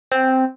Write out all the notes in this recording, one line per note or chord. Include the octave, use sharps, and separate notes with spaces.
C4